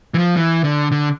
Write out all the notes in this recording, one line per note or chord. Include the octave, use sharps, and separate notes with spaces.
E3
F3
E3
D3
D3